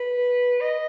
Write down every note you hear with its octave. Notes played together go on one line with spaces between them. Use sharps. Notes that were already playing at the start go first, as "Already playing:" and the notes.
Already playing: B4
D#5